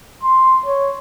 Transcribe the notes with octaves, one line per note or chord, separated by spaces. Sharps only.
C6
C#5